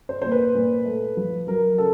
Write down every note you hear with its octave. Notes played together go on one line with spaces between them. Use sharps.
C5
A#2 C5
B4
A#2
A3
F3
F#3 A#4
C#3 A4